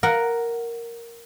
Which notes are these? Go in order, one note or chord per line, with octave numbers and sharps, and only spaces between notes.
A#4 F#5